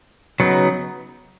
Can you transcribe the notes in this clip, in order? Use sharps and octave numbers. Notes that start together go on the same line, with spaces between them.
C#3 F#3 B3 D#4